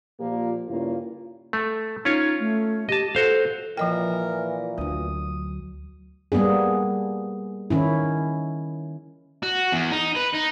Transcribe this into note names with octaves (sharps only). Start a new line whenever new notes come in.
A#2 F3 A#3 F4 G4
G2 C#3 A#3 E4 F4
A3
C#4 D#4 F4 C#5
A3
G4 D#5 A5
F#4 A4 C5 F5
A#2 E3 F3 A#4 D#5 G5
D2 F#3 D#6
G3 A#3 B3 D4 G#4
D#3 C#4 E4
F#4
E2
D#4
B4
D#4